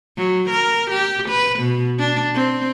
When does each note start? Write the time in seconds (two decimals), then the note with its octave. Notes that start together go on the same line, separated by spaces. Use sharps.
0.18 F#3
0.50 A#4
0.91 G4
1.29 B4
1.60 B2
1.99 D4
2.34 C4